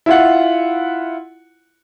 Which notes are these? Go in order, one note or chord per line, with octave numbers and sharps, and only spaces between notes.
E4 F4 F#5